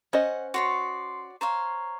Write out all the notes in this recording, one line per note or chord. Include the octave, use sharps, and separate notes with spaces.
C#4 C5 D#5 F#5
F#4 C#5 D5 C6 C7
C5 C#5 F5 A#5